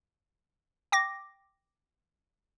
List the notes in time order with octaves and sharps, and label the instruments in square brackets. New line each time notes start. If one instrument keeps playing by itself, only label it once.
[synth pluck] G5 D6 A#6